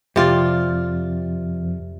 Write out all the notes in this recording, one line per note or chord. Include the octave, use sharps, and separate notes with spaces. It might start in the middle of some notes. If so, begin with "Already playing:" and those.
F2 C3 F4 D5